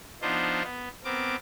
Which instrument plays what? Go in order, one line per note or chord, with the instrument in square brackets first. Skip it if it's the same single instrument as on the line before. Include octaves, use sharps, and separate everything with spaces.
[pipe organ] F3 B3 D4 D#4 F4 C5
B3
B3 C4 A#4 D6